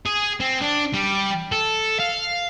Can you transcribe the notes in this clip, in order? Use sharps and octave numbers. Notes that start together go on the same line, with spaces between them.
G#4
C4
D4
G3
A4
F5